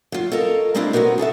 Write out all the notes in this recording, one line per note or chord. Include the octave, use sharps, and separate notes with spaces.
F#3 F4
A4 A#4 C#5 D#5 F5
G#3 A#3 C4 D4 E4 G4
F#3 B3 C4 F#4 A#4
G#4 A4 C#5 E5